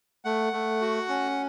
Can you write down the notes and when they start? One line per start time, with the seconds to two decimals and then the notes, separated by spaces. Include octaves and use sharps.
0.25 A3 F#5
0.53 A3
0.81 F#4
1.09 C#4